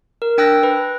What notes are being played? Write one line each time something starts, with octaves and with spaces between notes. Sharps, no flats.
A#4
D4 G5 E6 F#6 A#6
B4